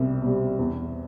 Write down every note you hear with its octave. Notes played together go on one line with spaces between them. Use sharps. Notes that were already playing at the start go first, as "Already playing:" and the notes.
Already playing: C2 B2 G3 C4
B2 G3
E2